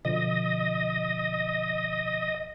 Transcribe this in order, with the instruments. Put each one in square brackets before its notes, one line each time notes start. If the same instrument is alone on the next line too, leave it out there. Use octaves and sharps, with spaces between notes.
[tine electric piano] B2 D3 F3 [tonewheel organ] D#5